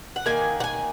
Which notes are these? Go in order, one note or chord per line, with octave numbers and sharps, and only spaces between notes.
F#5
D#3 A#3 G#5
F#5
G#5